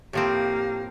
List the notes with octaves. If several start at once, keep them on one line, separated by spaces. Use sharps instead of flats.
A2 F3 A#3 C4 G4